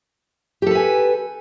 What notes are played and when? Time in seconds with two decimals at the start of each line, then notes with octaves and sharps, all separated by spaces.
0.62 G4
0.67 A4
0.71 B4
0.75 G#5